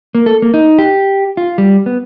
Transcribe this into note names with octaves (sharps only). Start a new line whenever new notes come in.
A#3
A4
A#3
D#4
G4
F4
G3
B3